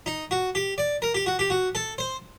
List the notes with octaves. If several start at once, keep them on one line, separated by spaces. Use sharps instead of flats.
D#4
F#4
G4
D5
A#4
G4
F#4
G4
F#4
A4
C5